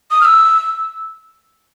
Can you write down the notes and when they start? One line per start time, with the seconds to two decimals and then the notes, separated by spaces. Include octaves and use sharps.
0.11 D#6
0.21 F6
0.25 E6